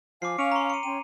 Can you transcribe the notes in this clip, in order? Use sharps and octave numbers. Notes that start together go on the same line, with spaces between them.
F3 F5 G#5 D6 C7
C#4 F5 G#5 C#6 D7 F7
A#5 C6
C#7 D#7
C#4 G5 C6 D#7